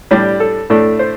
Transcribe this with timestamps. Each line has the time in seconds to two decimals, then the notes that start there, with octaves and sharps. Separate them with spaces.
0.11 A2 G3 D4 G4
0.40 A4
0.70 A2 A3 D4 A4
0.99 C5